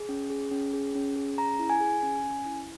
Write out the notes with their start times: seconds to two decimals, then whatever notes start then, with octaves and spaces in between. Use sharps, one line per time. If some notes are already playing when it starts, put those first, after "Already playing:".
Already playing: G#4
0.09 C#4
0.30 G#4
0.51 C#4
0.73 G#4
0.95 C#4
1.16 G#4
1.38 C#4 A#5
1.60 E4
1.70 G#5
1.80 G#4
2.03 C#4
2.24 C#4
2.45 E4